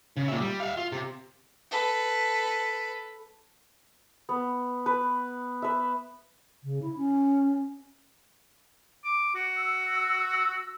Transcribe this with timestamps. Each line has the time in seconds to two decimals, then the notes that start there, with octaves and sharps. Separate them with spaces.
0.17 C#3
0.28 A#2 E5
0.40 G3
0.60 E5 F5
0.77 F4
0.92 C3
1.71 A4 B4
4.29 B3
4.86 B4
5.62 B4 E5
6.64 C#3
6.82 E4
6.96 C#4
9.05 D6
9.35 F#4
9.56 E6